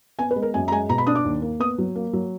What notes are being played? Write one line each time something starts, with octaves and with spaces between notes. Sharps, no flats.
B3 G#5
B4
G#3
A#4
F#2 G#5
A#5
G#3 G#5
B2 A#5
B5
D4 D#6
D6
D#2
A#3
B3 D#6
F#3
A#3
F#3